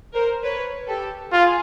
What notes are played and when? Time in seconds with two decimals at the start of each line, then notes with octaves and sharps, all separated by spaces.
0.14 A#4 C5
0.43 B4 C#5
0.87 G4 A4
1.32 F4 G#4